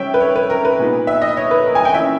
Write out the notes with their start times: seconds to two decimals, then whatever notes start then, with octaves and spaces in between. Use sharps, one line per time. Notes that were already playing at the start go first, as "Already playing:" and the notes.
Already playing: C#3 G3 C#4 C#5 E5 G5
0.14 B4
0.21 C#5
0.36 B4
0.50 A#4
0.65 B4
0.79 A#2 G#3 B3 D#4
1.07 E5
1.22 D#5
1.37 C#5
1.51 B4
1.66 A#4
1.75 G#5
1.85 G5
1.94 E3 A#3 C#4 E5